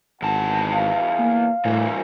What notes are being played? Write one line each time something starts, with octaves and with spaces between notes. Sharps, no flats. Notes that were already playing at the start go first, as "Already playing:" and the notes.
G#1 E2 F#5 A5
F5
A#3
A2 C3 E3